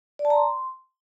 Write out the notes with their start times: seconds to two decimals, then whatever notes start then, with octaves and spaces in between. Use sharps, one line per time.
0.19 D5
0.25 A5
0.30 A#5
0.36 C6